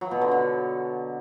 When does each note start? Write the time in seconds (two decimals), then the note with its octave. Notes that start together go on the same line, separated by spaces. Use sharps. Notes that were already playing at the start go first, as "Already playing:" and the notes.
0.01 F#3
0.11 B2
0.21 D3
0.32 D3